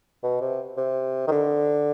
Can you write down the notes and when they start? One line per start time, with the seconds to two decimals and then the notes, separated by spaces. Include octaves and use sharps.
0.23 B2
0.41 C3
0.77 C3
1.27 D#3
1.31 D3